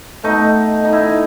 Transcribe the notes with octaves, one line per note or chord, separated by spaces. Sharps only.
B2 A3 D#4
D#4
E4
D#4